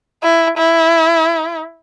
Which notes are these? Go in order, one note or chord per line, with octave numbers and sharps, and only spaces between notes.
E4
E4